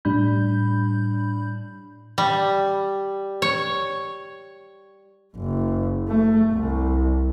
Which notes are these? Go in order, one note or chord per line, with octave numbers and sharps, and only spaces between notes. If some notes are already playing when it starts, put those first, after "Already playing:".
A2 G3 D4 B5 G6
G3
C#5
F#1
A3
C2